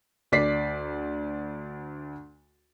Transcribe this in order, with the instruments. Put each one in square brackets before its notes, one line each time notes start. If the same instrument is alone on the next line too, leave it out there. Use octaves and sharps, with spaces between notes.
[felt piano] D2 D5 B6 C7